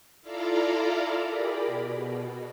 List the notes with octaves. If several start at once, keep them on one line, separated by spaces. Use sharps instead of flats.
E4 F4 A4 D5 F5 A#5
G4 G#4 A#4 D5 A#5 B5
B2